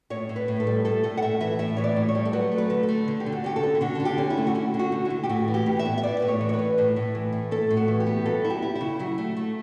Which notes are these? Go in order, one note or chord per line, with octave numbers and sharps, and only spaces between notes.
A2 C#5
A2
B4
A2
A4
G3
A2 A4
A2 A4
F#5
A2 E5
E3 E5
A2 E5
E3 C#5
D5
A2
C#5
G3
A4
F#3 B4
A3
B4
D3
A4
A3
D3
G4
D3
F#4
C#4 G4
A4
D3
E4
D3 F#4
D3 A4
G4
C#4
E4
A3
F#4
C#4 E4
D3
F#4
A3
E4
A3
G4
A2 F#4
E3
G4
A2
E5
B3
E5
A2 D5
A2 B4
C#5
E3
C#5
B4
A2
A2
A2
E3
A2
A2 A4
A2
F#4
E3
G4
B3
F#3 A4
E4
G4
E4
E4
C#3
F#3 E4
A3
A3